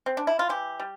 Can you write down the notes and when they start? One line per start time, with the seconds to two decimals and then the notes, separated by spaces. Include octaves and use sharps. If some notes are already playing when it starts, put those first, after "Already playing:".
0.06 C4
0.17 D4
0.27 E4
0.39 F4
0.49 E3 G4
0.80 G3